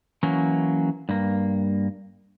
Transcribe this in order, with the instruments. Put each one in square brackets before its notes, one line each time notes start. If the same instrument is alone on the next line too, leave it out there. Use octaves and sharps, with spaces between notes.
[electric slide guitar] E3 F#3 A#3 C#4
G2 A#3